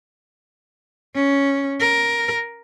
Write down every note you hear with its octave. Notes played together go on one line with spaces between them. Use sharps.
C#4
A#4